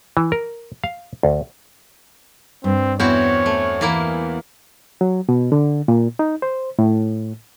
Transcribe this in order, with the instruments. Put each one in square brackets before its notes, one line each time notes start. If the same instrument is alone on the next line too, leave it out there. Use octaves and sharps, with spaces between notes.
[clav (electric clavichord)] E3
A#4
F5
D2
[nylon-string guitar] G2 [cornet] C4
[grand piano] E2 [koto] C4 E4 F#4 [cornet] C#5
[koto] A3
E3 A#3 E4
[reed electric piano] F#3
B2
D3
A#2
D#4
C5
A2